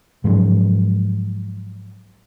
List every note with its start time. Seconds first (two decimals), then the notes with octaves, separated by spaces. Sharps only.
0.24 G#2 F3 F#3 G#3